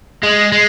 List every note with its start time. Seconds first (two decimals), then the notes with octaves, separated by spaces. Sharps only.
0.23 G#3
0.52 G#3